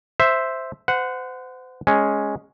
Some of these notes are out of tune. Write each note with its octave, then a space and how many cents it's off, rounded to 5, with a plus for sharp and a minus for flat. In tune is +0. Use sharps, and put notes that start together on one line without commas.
C5 +0 E5 +0
C5 -35 F#5 -10
G#3 +0 C#4 +0